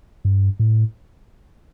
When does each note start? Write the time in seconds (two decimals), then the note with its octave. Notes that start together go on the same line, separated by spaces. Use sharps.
0.25 G2
0.59 A2